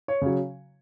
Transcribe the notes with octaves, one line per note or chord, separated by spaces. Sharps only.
C#5
C#3 F#3